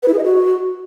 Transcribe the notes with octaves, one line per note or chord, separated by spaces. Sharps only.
B4
E4
G#4
D#5
F#4